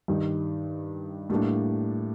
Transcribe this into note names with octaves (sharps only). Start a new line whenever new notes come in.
G2 D#3 G3
A2 G3 A#3 D4